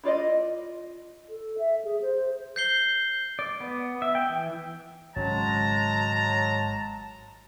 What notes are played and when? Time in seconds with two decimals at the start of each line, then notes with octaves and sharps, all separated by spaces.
0.04 E4 F4 D5 D#5
1.30 A4
1.58 E5
1.85 G#4
2.02 C5
2.56 G6 C7 G7
3.39 D5
3.60 B3
4.02 E5
4.15 G5
4.29 E3
5.16 G#1 C#3 F#3 G#3 C#4 A5 A#5